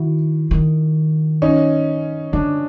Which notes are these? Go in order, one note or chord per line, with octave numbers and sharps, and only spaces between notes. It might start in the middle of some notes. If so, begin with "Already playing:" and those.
Already playing: D#3 E4 F#4
D#3
C#4 D#4
D3 D4